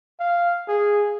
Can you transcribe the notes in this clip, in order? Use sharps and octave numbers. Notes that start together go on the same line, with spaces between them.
F5
G#4